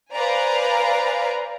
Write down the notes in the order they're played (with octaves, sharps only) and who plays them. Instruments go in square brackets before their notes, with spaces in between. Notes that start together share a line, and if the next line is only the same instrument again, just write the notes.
[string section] B4 C5 D5 F5 G#5 A#5